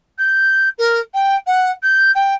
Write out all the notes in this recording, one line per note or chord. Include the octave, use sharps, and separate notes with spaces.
G6
A#4
G5
F#5
G6
G5